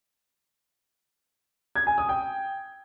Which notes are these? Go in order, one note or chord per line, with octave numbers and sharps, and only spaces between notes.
G#6
G#5
D#6
G5